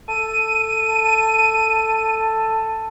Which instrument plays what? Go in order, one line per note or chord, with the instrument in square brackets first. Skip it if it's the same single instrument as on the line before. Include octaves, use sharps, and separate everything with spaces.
[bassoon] A4 [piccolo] D#7